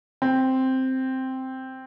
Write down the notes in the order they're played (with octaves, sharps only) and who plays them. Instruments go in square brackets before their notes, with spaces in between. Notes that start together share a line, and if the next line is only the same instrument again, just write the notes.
[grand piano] C4